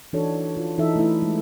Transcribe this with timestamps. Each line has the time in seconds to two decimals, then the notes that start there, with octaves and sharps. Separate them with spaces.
0.13 E3 D4 D#4 F#4 A4 C#5
0.57 F4
0.78 E3 D#4 E4 A4 E5
0.96 A3 E4
1.22 G#3